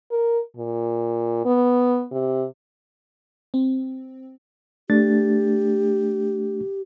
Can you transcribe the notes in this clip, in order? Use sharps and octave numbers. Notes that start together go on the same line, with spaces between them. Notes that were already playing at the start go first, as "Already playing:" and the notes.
A#4
A#2
B3
C3
C4
A3 D4 G4 A6